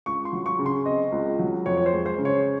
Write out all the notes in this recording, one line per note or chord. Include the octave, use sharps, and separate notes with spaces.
C#2 C#6
C6
F#3
C#6
C#3
C6
C4 D#5
C#2
F#3
F2 C#5
C#5
C5
G#3
C5
C#3
C#5